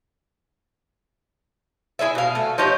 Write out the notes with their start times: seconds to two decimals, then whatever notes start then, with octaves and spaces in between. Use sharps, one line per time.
1.99 E4 G#4 C#5 E5
2.15 B2 F5
2.35 A3
2.58 F3 D#4 G4 C#5